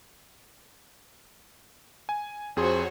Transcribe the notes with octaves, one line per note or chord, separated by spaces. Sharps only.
G#5
F2 F#4 G#4 C5 C#5 C6